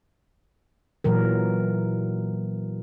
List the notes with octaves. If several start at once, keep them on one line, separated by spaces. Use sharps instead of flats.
A#2 E3 F#3 A#4